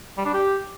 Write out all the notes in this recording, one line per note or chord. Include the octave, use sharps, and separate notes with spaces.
G3
D4
G4